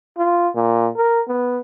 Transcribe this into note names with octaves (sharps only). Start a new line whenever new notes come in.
F4
A#2
A#4
B3